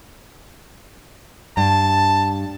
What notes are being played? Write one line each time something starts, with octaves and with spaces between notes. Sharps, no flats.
G2 A5